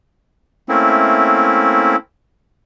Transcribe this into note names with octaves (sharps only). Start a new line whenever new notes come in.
A3 A#3 C4 C#4 E4